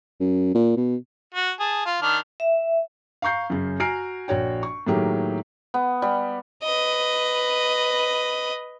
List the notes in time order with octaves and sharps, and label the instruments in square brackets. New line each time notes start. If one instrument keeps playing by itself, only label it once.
[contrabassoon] F#2
A#2
B2
[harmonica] F#4
G#4 A5
F4
D#3 D4 F6
[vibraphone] E5
[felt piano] F5 A#5 C#6 G6 C7
F#2 C#3
F#4 G#5 A#5 F6 C7 D7
A#1 F#4 C#5 G5
C#6
A2 D#3 F#3 A#3 G4 G#4
[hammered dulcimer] B3
G3
[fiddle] B4 D#5